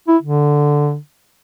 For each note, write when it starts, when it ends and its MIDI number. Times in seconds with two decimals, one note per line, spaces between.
0.08 0.17 64
0.22 0.97 50